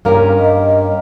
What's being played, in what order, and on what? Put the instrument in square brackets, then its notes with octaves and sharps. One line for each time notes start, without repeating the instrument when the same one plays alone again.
[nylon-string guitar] G2 C#4 A#4 [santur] A#3 G4
[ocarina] D#5